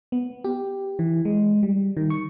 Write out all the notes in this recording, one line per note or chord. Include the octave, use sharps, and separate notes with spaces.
B3
G4
E3
G#3
G3
D#3
C#6